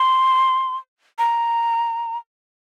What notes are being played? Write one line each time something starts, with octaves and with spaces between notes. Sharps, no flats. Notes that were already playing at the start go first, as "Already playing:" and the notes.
Already playing: C6
A#5